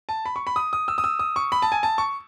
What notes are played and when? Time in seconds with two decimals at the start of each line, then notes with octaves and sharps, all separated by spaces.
0.09 A5
0.26 B5
0.36 C#6
0.47 B5
0.56 D#6
0.73 D#6
0.88 E6
0.98 D#6
1.04 E6
1.19 D#6
1.36 C#6
1.52 B5
1.62 A5
1.72 G#5
1.83 A5
1.98 C#6